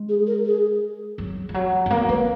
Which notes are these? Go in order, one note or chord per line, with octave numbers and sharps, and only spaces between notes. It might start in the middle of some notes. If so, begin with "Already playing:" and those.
Already playing: G#3
G#4
A#4
G#4
F#3
F3
F#3
G#3
A#3 A#4
A#3 B4